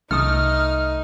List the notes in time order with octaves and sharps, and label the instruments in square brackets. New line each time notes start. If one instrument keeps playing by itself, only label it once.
[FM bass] C2 [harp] A3 D#6 [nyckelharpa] D#4 [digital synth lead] F6